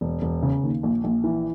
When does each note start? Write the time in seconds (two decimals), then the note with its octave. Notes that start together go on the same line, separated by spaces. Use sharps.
0.01 E1
0.22 E1
0.42 C#3
0.63 D#2
0.83 A#1
1.04 A#1
1.24 E3